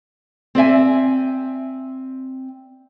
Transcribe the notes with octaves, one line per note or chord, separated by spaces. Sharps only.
C4 D5 E5 G#5